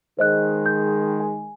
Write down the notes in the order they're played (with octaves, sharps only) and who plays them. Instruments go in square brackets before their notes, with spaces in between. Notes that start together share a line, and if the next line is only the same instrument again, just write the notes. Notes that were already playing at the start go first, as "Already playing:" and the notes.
[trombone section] D#3 G#3 [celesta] C5 D#5 F#6
[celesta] G6
G#5